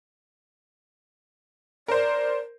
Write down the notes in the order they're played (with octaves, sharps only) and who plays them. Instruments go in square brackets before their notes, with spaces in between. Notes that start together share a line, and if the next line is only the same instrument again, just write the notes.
[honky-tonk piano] A#4 C5 [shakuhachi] D5